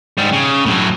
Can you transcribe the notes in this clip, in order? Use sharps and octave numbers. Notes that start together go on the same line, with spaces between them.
G#2 G3
C#3
A2 F#3